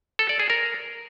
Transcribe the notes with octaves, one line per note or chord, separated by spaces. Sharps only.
A4
D5
G#4
A#4